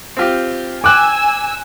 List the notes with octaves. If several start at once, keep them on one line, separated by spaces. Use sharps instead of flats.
C4 F4 G4
G5 G#5 D6 E6 F#6